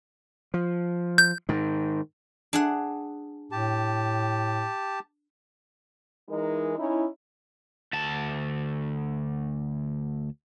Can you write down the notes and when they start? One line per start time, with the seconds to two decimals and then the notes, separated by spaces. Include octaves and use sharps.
0.54 F3
1.18 G6
1.49 G#2 D#3
2.53 D4 G#4 F#5
3.52 A2 G4 A5
6.29 E3 G#3 D#4 A#4
6.77 C#4 D#4 E4
7.93 D2 A5